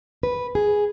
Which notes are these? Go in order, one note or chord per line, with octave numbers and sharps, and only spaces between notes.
B4
G#4